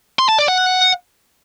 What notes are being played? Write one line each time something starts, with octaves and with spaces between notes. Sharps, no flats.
C6
A5
D5
F#5